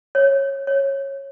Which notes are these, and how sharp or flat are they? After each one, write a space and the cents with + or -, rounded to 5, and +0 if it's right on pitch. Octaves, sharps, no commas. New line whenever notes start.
C#5 -15
C#5 -15